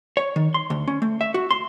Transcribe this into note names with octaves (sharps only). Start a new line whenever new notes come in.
C#5
D#3
C6
D2
C#4
A3
E5
F#4
C6